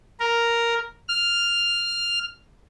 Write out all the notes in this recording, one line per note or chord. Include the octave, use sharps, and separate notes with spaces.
A#4
F6